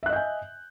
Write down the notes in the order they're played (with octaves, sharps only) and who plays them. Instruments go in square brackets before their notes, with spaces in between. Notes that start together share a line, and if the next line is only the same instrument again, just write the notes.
[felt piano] E5
F#6
D#5
G6
G#5